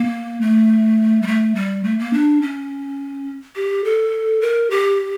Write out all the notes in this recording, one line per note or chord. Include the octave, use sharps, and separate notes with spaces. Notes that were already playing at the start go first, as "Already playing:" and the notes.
Already playing: A#3
A3
G3
A3
G3
A3
A#3
D4
C#4
G4
A4
A#4
G4